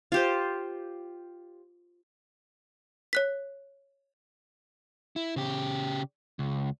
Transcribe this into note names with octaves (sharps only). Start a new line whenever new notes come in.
F4 G4 C5
C#5 F#6 B6
E4
C#3 G4
C#2